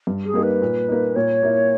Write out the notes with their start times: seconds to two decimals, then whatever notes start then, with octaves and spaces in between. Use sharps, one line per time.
0.07 G2
0.26 G#4
0.34 G3 A#3 D#4
0.43 B4
0.62 A#2
0.88 A#3 D#4
1.16 A#2 C#5
1.43 A#3 E4